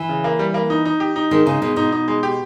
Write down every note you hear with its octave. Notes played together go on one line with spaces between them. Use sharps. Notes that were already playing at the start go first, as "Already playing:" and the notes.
Already playing: E3
C#3
A#3
G3
A#3
D#4
D#4
G4
D#4
D#3 G#3
C#3 D#4
B2 G#3
B2 D#4
D#4
G#3
G4